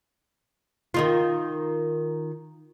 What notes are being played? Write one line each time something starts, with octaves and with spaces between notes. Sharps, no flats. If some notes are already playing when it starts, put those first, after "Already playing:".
D#3 D#4 F4